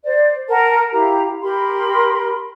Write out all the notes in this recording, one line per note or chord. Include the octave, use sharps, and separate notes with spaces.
C5 D5
A#4 F#5 A5
E4 G4 F5 A#5
G4 A#4 B5 C6